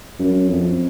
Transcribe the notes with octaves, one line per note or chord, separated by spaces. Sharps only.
F#2
F2